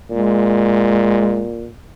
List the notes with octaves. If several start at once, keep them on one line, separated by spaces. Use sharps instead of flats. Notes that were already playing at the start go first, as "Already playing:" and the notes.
A#2 G#3